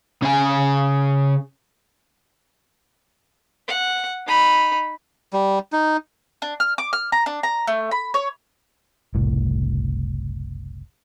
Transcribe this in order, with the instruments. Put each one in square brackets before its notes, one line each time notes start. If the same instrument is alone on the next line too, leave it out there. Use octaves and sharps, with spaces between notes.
[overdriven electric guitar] C#3 G#5
[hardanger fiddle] F#5
D#4 B5
[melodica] G3
D#4
[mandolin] D4
F6
D6
F6
A#5
D4
A#5
A3
B5
C#5
[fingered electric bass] F#1 C2 A2